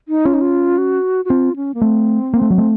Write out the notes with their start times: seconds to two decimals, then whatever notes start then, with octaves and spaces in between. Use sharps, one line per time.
0.08 D#4
0.25 C#4 F4
0.34 D#4
0.41 F4
0.78 F#4
1.25 F#4
1.29 C4 F4
1.56 C#4
1.74 A#3
1.82 A3 C4
2.34 A#3
2.42 A3
2.50 F#3
2.58 A3